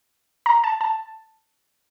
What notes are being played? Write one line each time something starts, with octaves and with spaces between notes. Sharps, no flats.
A#5
A5
A5